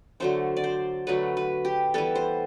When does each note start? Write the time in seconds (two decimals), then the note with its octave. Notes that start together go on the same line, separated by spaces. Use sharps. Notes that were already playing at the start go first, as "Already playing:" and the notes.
0.20 D3 F#3 A3 C5
0.57 D5
0.64 C5
1.07 D3 F#3 A3 B4
1.37 B4
1.65 G4
1.94 E3 G3 B3 A4
2.15 C5